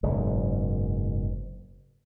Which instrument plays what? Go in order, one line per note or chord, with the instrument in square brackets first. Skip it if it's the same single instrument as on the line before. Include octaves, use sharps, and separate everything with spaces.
[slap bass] F#1 G#2 B2